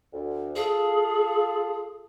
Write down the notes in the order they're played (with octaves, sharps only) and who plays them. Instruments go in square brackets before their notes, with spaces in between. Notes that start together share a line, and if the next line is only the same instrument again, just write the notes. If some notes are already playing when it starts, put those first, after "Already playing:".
[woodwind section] D2
[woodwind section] F4 A4 [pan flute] G#4